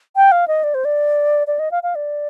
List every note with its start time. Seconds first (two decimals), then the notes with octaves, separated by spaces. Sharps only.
0.16 G5
0.32 F5
0.48 D#5
0.64 D5
0.74 C5
0.85 D5
1.47 D5
1.59 D#5
1.71 F5
1.83 F5
1.95 D5